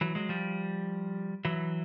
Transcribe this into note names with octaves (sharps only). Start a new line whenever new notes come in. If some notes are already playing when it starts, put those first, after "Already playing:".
E3 F#3
F#3 G#3
F3 G3
E3 F#3